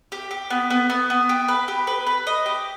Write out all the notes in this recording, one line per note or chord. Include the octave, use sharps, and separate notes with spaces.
G4
G4
B3
B3
B3
B3
G4
B4
G4
B4
B4
D#5
G4